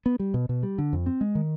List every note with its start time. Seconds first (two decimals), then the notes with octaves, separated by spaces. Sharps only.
0.06 B3
0.20 G3
0.34 B2
0.49 B2
0.63 G3
0.78 D3
0.93 F2
1.06 C4
1.21 G#3
1.35 D#3